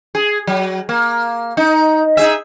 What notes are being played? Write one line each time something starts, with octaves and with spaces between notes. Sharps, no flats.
G#4
F#3
A#3
D#4
D#4 G#4 E5